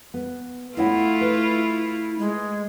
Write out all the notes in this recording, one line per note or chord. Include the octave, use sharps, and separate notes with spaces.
B3
A3 B3 E4 F4 D#5 F#5
B4
G#3